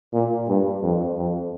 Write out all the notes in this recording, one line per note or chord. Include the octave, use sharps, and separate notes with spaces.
A#2
G2
F2
F2